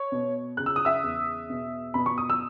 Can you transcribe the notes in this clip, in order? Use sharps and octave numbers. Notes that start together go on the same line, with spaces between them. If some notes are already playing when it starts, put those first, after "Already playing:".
Already playing: C#5 C#6
B2
C#3 F#6
E6
D#6
E5 E6
E2
B2
B2 B5
C#6
D#6
E6